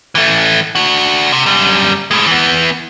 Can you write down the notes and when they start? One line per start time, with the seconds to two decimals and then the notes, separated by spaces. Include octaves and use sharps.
0.15 E3 A3
0.75 D4 F#4
1.32 C3
1.46 F#2 G3
2.11 A2 G#3
2.27 E3 B3